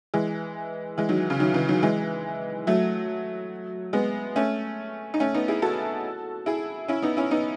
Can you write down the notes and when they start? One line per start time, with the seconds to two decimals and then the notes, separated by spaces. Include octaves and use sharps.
0.14 E3 G#3
0.98 E3 G#3
1.09 D#3 F#3
1.30 C#3
1.40 D#3 F#3
1.54 C#3 E3
1.69 D#3 F#3
1.83 E3 G#3
2.67 F#3 A3
3.93 G#3 B3
4.36 A3 C#4
5.14 D#4
5.20 A3 C#4
5.34 B3 D#4
5.48 E4 G#4
5.62 F#4 A4
6.46 E4 G#4
6.88 C#4 E4
7.02 B3 D#4
7.17 C#4 E4
7.31 B3 D#4